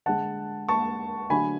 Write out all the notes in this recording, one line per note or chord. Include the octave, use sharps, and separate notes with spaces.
D3 G#3 F#5 A5
A5 C#6
D3 F#3 A3 G#5 B5